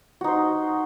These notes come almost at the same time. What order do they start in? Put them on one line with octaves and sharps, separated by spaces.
F#4 D#4 C5